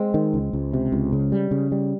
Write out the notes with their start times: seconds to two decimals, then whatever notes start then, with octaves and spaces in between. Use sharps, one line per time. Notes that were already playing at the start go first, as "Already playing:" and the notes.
Already playing: G#3 C4
0.14 D#3
0.34 C#2
0.53 C#2
0.73 C3
0.92 C#2
1.13 C#3
1.32 G3
1.51 C#3
1.72 G3